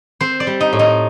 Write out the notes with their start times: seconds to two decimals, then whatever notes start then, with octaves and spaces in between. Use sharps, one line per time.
0.21 C4 C5
0.40 D5
0.47 G3
0.60 D#4
0.73 A2
0.79 D#4